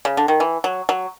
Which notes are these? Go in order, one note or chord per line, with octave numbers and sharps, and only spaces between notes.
C#3
D3
D#3
E3
F#3
F#3